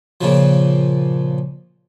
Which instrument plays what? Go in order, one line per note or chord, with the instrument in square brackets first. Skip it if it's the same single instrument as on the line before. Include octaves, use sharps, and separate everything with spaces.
[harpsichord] A#2 C#3 F3